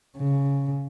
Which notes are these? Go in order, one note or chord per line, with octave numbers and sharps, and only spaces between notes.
C#3